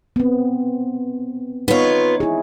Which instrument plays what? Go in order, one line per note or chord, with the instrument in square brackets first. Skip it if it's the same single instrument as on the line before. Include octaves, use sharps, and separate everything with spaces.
[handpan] B3 C4
[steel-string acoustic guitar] B3 F4 [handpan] D#4 C#5
[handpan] E4 G#4